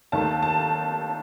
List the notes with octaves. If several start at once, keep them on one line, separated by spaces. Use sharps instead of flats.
D#2 D#3 A3 A5
A5